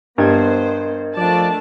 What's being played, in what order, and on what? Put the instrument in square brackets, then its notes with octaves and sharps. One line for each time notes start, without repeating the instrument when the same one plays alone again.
[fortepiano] G2 [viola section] B3 C5 [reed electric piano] A#4 D#5 G#6
[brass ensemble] F3 D5 [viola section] A3 D4 A5